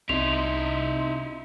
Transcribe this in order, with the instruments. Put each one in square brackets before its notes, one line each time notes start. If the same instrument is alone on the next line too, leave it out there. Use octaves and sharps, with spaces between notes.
[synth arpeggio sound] C2 C6 [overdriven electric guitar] D#4 E4 [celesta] F7